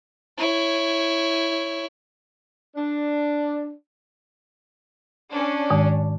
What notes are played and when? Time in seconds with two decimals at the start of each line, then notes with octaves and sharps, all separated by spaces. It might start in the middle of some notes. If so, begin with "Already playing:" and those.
0.38 E4 C#5
2.76 D4
5.31 C#4 D4
5.70 G#2 D#3 G#3